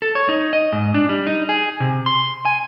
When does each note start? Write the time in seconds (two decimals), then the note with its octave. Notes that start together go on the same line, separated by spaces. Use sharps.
0.02 A4
0.15 C#5
0.29 D#4
0.53 D#5
0.73 G#2
0.94 D4
1.09 G3
1.27 D#4
1.49 G#4
1.80 C3
2.06 C6
2.45 G#5